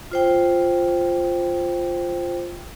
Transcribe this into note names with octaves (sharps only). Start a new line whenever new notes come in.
F4 C5 G5